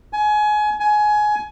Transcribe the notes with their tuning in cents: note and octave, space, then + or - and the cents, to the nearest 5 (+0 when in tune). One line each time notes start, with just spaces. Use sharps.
G#5 +25
G#5 +20